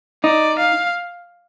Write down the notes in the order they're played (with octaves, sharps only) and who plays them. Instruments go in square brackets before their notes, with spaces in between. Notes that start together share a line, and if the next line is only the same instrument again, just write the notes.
[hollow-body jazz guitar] D#4 [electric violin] D5
[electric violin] F5